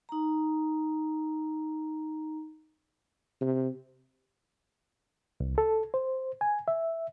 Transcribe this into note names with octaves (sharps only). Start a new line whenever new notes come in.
D#4 A#5
C3
C2
A4
C5
G#5
E5